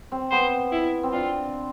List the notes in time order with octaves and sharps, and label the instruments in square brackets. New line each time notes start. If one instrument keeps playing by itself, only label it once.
[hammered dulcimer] C4
[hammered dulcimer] B3 [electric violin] C5
[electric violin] E4
[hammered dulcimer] C4
[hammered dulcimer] D4 [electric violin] F4